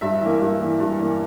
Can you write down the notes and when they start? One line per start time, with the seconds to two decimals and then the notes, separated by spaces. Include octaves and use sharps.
0.01 G2 E5
0.21 E3 A#3
0.41 G2
0.60 E3 A#3
0.80 G2
0.98 E3 A#3